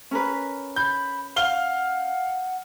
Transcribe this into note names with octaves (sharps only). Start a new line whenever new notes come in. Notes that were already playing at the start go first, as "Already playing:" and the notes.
C#4 A#4 B4
B5 G6
F5 F#5 F6 G7